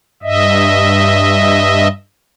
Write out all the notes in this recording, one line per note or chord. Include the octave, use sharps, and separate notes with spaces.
G2 D#5 E5